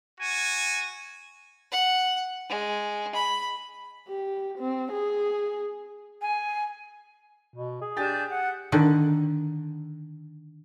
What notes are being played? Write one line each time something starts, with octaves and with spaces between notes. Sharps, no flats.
F#4 G#5
F#5
G#3
B5
G4
C4
G#4
G#5
B2
G#4
D4 G4 G#5 G6 A6
F#5
D3 D#3